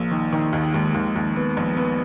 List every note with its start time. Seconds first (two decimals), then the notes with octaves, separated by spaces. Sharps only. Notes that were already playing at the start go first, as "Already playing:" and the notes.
Already playing: A#1 A#3
0.11 D#3
0.33 D#3
0.53 D#2
0.74 D#2 G#3
0.94 D#2
1.16 D#2
1.36 B3
1.57 A#1
1.77 B3